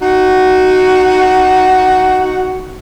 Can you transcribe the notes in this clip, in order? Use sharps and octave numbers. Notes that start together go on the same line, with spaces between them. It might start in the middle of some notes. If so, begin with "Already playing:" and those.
D#4 F#4